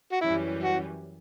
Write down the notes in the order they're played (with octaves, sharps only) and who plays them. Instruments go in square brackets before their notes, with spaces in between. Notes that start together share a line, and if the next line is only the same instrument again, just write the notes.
[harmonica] F#4
[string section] F#2 E3 G3 C#4 [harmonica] E4
[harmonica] F#4